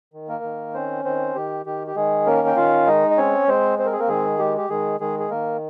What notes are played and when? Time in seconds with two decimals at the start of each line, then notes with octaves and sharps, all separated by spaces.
0.14 D#3
0.28 A#3 A#4
0.43 D#3
0.74 C4 C#4 C5
1.05 D#3 C4 C5
1.35 D#3 G4
1.66 D#3 G4
1.87 G4
1.96 D#3 G#3 G#4
2.26 A#3 C#4 A#4
2.47 G5
2.56 D#3 F4 F5
2.87 G#3 D#4 D#5
3.11 D#5
3.17 C4 C#4 C#5
3.48 G#3 C4 C5
3.78 C4 C5
3.86 A#4
3.93 G#4
4.00 A#3 A#4
4.09 D#3 G#3 G#4
4.39 G#3 G4
4.57 G4
4.69 D#3 G#3 G#4
5.00 D#3 G#3 G#4
5.20 G#4
5.30 D#3 A#3 A#4